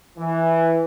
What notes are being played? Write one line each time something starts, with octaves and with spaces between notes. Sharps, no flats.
E3